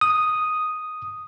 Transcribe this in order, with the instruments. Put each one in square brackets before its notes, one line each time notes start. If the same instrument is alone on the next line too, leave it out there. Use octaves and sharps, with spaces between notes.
[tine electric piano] D#6